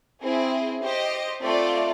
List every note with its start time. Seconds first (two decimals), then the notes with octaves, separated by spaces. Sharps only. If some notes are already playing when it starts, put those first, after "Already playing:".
0.22 C4 E4 G#4
0.82 G4 C5 D#5
1.42 A3 C4 F4 A4 D5